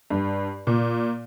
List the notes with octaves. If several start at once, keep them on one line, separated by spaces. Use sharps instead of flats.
G2
A#2